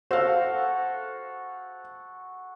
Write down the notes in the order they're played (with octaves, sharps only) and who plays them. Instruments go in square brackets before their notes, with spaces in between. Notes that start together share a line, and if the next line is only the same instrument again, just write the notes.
[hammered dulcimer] F#4 A4 [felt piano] C5 F5